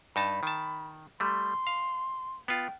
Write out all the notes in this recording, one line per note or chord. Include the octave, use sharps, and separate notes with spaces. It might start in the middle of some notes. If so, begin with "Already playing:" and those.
G2 D#4 A5 B5
D#3 A5
G3 A3 C6
F5
B3 F4 G5